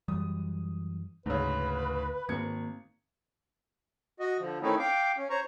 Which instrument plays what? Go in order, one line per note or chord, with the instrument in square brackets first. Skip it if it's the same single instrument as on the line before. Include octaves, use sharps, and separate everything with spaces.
[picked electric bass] F#2 E3 G3 [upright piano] D#6
[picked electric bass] D2 [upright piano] G#2 C#3 [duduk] B4
[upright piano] G#1 G#6 C#7 [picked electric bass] D#3 A#3 C4
[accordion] F#4 D#5
D3 F3
D#3 A3 C4 C#4 D#4 E4
F5 G5 D6
C#4
C5 C#5 A#5 C#6